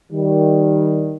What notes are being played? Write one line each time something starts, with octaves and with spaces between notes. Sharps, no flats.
D#3 G3